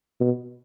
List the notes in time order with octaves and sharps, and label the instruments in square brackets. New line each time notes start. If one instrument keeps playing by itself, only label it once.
[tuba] B2